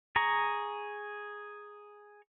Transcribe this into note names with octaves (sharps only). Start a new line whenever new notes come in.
G#4 A#5 C#6